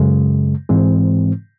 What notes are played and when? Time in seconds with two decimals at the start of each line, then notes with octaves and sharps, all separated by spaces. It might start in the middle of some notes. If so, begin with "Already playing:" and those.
Already playing: F#2 C#3 G#3
0.69 G#2 E3 G#3 C4